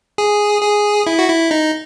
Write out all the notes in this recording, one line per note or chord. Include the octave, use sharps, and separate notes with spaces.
G#4
G#4
E4
F#4
E4
D#4